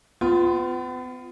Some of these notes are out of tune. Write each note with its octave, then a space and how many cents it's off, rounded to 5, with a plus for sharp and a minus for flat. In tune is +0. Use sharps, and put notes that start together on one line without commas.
B3 +40 F4 +0